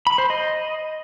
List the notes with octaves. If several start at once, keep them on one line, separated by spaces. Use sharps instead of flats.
B5
C5
D#5